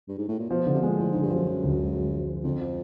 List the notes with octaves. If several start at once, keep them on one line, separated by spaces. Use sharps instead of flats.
G2
G#2
A2
A#2
B2 F3
D3
C3
B2 G#3
A#2
A2 F3
G#2 D3
G2
F#2 F3
F3
D2
G#3
G#3
F3
F3
F2 D3
F3